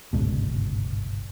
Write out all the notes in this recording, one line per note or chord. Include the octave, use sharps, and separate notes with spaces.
G1 C#2 G#2 B2